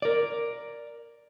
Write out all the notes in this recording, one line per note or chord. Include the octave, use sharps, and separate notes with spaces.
A#4 D5